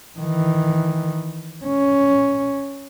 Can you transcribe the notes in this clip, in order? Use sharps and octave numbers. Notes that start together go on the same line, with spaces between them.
D#3 E3
C#4